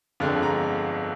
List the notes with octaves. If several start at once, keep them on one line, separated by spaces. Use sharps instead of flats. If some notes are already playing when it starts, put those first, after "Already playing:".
G1 F2 D3 G#3 F5
A#5